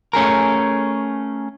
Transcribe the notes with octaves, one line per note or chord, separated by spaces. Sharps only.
A3 C#4 G#4 A#4